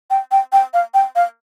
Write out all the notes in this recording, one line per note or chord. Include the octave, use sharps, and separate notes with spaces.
G5
G5
G5
F5
G5
F5